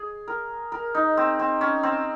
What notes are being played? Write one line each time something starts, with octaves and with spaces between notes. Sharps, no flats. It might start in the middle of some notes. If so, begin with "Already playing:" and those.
Already playing: G#4
A#4
A#4
D#4
C4
C4
C#4
C4